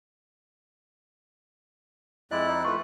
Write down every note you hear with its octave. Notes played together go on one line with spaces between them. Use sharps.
F2 G#3 E4 D5 D#5 F#6
D#4
A3 F4 B4 C#6